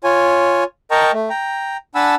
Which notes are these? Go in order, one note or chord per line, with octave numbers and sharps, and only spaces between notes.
F4 C#5 G#5
A#4 D#5 G5 A5 A#5 C#6
A3
G5 A#5
D4 F#5 G#5 A5 B5 E6